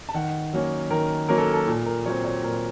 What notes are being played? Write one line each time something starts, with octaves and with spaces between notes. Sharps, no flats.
A5
D#3 F#5
F#3 A#3 C#4
D#3 A#4
F#3 A#3 C#4 A#4
A4
A4
A#2
A#4
F#3 C4 C#5
C#5
A#2 A#4